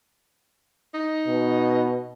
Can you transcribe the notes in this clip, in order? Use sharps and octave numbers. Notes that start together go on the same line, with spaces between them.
D#4
B2